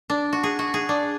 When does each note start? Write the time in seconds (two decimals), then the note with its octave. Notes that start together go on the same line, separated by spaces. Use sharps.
0.10 D4
0.33 F#4
0.43 G#4
0.59 F#4
0.74 G#4
0.89 D4